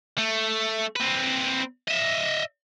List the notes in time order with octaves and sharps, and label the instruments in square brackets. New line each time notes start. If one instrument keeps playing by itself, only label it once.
[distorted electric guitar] A3
C4 B4
D#5 E5